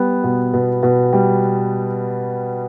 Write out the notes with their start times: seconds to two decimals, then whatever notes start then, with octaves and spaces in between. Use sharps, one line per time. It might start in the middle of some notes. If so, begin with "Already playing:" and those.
Already playing: G3 B3
0.24 B2
0.53 B2
0.83 B2
1.13 G3